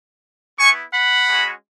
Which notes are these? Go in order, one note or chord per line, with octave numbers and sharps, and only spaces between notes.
B3 E4 G#5 C#6
F#5 B5
G#3 C#4 F#4